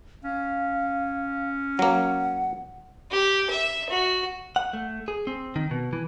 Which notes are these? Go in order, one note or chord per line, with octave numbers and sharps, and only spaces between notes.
C#4 F5
F#3 A#3 F#5
G4
E5
F#4
F#5
A3
G#4
C4
D#3
B2
E3